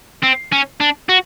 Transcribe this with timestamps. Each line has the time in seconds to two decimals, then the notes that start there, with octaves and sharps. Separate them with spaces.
0.23 C4
0.52 C#4
0.80 D4
1.09 F#4